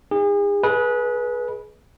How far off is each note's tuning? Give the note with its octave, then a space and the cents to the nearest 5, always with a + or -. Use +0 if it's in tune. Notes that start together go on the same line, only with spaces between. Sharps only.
D#4 +20 G#4 -40
G#4 +25 B4 -20 D#5 +0